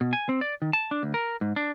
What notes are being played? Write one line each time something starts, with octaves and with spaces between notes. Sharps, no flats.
B2
G#5
C4
D5
D#3
A5
D4
D2
A#4
G#2
D4